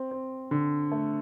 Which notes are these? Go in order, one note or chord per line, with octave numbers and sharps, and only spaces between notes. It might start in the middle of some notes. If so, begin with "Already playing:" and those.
Already playing: C4
C4
D3
A3